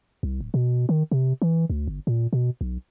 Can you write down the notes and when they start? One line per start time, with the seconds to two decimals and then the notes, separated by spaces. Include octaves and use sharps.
0.23 C2
0.41 D1
0.54 B2
0.89 D#3
1.12 C3
1.42 E3
1.70 D2
1.87 G1
2.07 A#2
2.33 B2
2.61 B1